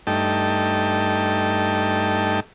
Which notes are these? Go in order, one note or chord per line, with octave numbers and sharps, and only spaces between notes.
G2 A3 D#4 G5 A5